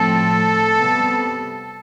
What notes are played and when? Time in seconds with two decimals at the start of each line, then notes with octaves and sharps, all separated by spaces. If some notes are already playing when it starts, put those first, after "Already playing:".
Already playing: A2 F3 A3 C4 A4
0.76 C3 G3 B3